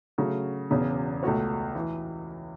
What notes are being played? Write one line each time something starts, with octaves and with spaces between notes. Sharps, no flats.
C#3 F#3 A3 F#4
E1 E2 C#3
C#2 B2 A3 F#4 C#5
E3